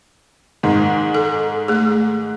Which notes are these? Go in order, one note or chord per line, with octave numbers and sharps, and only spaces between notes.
G#2 D#3 G#3
A4
A3 G#4